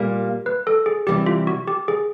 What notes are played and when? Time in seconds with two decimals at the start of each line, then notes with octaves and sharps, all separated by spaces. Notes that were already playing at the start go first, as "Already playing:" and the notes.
Already playing: A#2 G3 A#3
0.46 B4
0.67 A4
0.86 G#4
1.07 C3 E3 G3 G4
1.26 F4
1.47 F#4
1.67 G4
1.88 G#4